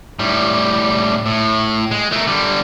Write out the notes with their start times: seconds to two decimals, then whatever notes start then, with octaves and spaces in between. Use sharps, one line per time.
0.19 A2 G3
1.26 A2
1.91 G#3
2.12 A3 A#4
2.27 D3 G3